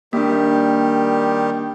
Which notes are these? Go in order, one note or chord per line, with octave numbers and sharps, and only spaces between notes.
D#3 G3 A#3 D4 G4